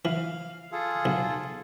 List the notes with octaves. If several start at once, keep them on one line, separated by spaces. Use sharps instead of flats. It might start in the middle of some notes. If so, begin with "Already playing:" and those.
E3 F5 F6
F4 G#4 A4
B1